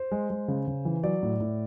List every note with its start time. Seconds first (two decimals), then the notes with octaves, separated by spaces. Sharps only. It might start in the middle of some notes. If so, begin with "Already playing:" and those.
Already playing: C5
0.12 G#3
0.30 G#3
0.48 C#3
0.68 C#3
0.85 E3
1.03 F#3 D5
1.23 A2
1.40 A2